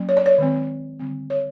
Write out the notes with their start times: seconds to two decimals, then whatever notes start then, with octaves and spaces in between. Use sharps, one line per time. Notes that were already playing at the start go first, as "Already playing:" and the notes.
Already playing: F#3 A#3 C#4
0.09 C#5
0.17 D5
0.26 C#5
0.38 D#3 G#3 C4
0.99 D3 G3 C4
1.30 C#5